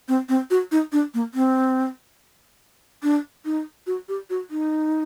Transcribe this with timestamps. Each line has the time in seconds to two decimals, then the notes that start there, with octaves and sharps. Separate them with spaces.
0.08 C4
0.29 C4
0.50 F#4
0.72 D#4
0.92 D4
1.14 A#3
1.34 C4
3.03 D4
3.45 D#4
3.87 F#4
4.09 G4
4.30 F#4
4.51 D#4